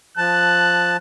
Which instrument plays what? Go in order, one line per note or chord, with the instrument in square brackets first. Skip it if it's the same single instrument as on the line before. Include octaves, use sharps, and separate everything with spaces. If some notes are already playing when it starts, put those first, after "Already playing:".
[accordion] F3 A5 [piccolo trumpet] F#6